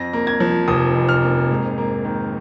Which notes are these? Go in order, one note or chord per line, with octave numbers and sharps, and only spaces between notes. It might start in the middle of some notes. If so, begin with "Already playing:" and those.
Already playing: F2 A#6
A#3
G#6
F3
F1 D#6
F2
F6
A#3
G#2
A#3
D#3